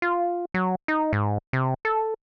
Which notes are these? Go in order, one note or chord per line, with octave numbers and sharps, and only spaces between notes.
F4
F#3
D#4
G#2
C3
A4